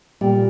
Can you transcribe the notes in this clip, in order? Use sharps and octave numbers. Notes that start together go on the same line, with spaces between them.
A#2 G3